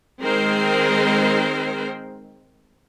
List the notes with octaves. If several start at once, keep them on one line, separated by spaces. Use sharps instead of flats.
D#3 G#3 C4 A#4 C5